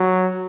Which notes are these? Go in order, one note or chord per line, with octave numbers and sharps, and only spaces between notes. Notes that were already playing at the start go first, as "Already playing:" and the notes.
Already playing: F#3